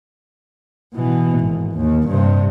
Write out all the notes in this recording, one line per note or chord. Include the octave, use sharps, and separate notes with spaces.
B2 E3
G#1
D#2
G2 C3